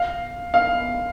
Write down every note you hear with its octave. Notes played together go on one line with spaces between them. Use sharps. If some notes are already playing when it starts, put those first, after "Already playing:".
Already playing: F5
F5